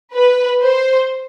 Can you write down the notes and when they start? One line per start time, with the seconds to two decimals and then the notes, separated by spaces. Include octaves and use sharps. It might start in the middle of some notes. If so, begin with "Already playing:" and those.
0.13 B4
0.62 C5